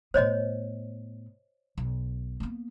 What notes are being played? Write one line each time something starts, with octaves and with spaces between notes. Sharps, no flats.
A2 B3 C5 C#5 D#5
B1
A#3 B3